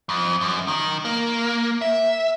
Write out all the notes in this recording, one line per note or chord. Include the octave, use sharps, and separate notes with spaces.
F2
F#2
D#3
A#3
E5